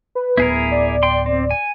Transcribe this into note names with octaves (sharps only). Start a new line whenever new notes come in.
B4
D1 B3 E4 G#4 A#4
D5
G5 C6
C4
G#5